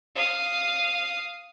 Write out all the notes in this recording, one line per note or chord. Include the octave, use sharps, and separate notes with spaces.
F5 D#6